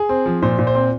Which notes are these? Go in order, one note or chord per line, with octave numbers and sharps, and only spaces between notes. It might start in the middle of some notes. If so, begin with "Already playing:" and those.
Already playing: G#4
C4
F3
A#2 C5
A#2
C5
C4